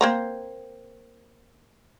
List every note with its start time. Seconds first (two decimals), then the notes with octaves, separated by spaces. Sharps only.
0.01 A#3 C4 A#5